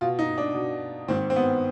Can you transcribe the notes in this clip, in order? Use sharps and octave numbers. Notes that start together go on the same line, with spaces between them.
B2 F4
D#4
D4
B2
G#2 D#3 C4
C4
B3